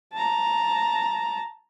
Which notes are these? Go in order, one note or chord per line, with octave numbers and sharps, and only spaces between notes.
A5 A#5